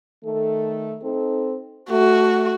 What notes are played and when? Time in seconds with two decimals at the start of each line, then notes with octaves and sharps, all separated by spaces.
0.24 D#3 A3 A4
1.02 C4 D#4 A4
1.90 A3 F#4